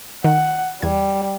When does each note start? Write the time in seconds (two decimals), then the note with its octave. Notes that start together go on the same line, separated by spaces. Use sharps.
0.24 D#3 F#5
0.82 E2 G3 G#6